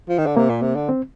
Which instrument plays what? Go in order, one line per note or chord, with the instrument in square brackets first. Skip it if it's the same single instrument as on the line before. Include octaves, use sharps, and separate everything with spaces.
[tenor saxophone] F3
D#3
D3
[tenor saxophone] C3 [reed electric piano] A#3
[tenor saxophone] A#2
C3
D3
[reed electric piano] C4